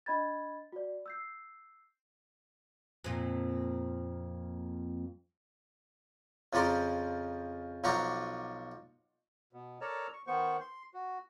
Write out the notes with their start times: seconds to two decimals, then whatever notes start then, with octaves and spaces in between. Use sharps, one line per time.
0.06 D4 D#5 B5 G#6 A6
0.72 F#4 D5
1.06 E6 G6 C7
3.04 F2 A#2
6.53 F2 C#3 F3 D5 A#5 C6
7.84 B1 F3 D4 F#4 F5 A#5
9.53 B2
9.81 A4 A#4 C#5 D5 A5 A#5
10.13 C#6
10.27 D#3 B3 C5 C#6
10.60 C6
10.94 F#4